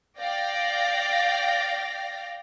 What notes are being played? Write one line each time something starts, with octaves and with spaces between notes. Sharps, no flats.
D5 F5 G5 A#6